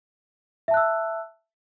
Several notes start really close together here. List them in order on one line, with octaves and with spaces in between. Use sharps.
E5 A5 F#6 E6